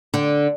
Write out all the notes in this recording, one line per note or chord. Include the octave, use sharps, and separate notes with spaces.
D3